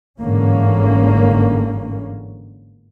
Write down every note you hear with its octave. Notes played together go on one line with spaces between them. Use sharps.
G1 G#2 D3 E3 A#3 C#4